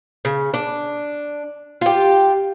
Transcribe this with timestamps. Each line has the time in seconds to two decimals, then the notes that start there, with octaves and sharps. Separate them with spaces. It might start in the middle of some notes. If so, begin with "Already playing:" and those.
0.25 C#3
0.54 D4
1.81 F4 G4